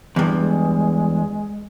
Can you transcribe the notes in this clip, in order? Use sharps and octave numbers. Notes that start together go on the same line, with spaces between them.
E2 G2
G#3